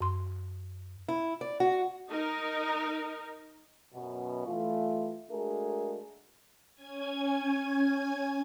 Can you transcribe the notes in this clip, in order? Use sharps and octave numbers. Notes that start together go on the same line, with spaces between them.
F#2 C6
E4
D5
F#4
D#4 A#4
F#2 B2
E3 A3 F4
G#3 A3 D4 F#4 G#4 A#4
C#4 G#5 G#6